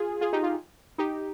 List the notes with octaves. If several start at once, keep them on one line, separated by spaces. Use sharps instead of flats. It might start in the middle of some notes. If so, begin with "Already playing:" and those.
Already playing: F4 G#4
F4 G#4
D#4 G4
F4
D#4 G4